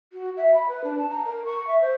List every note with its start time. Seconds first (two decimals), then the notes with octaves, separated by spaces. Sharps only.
0.13 F#4
0.37 E5
0.54 B5
0.68 B4
0.84 D4
0.98 A5
1.10 A#5
1.25 A#4
1.45 C#6
1.67 E5
1.81 C5